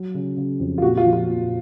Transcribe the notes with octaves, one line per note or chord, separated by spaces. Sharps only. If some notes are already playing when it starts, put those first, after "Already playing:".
Already playing: F#3
C#3
C#3
F2
F4
A#2 F#4
F4
F3
F4
A#2